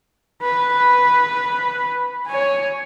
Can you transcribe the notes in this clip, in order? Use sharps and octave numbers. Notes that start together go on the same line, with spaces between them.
B4
C#5 G#5